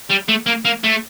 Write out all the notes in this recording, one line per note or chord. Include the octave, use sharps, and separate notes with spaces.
G3
A3
A#3
A#3
A3